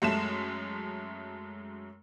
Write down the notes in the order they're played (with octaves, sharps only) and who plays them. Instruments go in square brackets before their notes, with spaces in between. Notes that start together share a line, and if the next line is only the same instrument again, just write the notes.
[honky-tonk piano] F#2 G#3 A3 E7